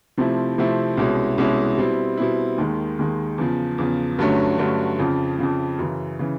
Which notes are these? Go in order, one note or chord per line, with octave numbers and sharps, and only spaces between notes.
C3 F3 A3 C4 E4
C3 F3 A3 C4 E4
C2 B2 G#3 C#4 E4
C2 B2 G#3 C#4 E4
B2 G3 C4 E4
B2 G3 C4 E4
D#2 D#3 G#3
D#2 D#3 G#3
E2 C#3 F3
E2 C#3 F3
G2 D3 F#3 A3 C#4
G2 D3 F#3 A3 C#4
F2 C#3 F3
F2 C#3 F3
F#2 C#3 E3
C#3 E3